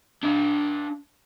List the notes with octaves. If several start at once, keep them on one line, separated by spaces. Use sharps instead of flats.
D4 F5